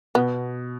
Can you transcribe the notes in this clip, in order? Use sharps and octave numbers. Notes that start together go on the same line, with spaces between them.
B2 B3